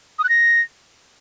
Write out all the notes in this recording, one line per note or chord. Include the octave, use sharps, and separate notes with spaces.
D#6
F#6
A#6